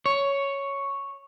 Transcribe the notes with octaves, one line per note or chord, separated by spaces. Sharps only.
C#5